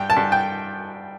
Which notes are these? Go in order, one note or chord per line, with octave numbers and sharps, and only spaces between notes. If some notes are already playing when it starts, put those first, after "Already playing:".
Already playing: G2 G5
A5
G2
G5